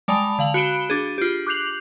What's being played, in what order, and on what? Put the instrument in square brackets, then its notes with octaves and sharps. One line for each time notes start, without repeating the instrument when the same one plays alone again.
[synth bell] G3 G#3 D5 A5 B5 F7
D3 F5 F#7
F#4 B5 F#6 D7 E7 G7
D4 G#4
F4 G4
D6 F#6 G6 C7 F7 F#7